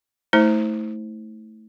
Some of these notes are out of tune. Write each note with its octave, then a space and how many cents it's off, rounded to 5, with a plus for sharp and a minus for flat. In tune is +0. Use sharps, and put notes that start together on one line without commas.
A3 +0 E4 -40 C5 +5